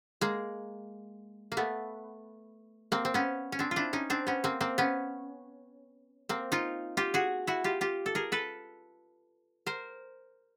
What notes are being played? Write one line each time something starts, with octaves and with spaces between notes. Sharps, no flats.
G#3 A#3
A#3
A3 B3
A#3 C4
C4
B3 C#4
C#4
C4 D4
F4
D4 E4
C#4 D#4
C4 D4
B3 C#4
A#3 C4
A#3 C4
B3 C#4
A#3 C4
D#4 F4
F4 G4
F#4 G#4
E4 F#4
F4 G4
F4 G4
A4
G#4 A#4
A4 B4
A#4 C5